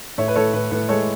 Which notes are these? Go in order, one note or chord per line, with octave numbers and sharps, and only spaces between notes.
A2 C#5 E5
B4
A2 A4 C#5
A2 B4
A2 B4
G#3 A4 C#5